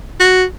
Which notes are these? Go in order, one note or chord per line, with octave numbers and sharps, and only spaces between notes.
F#4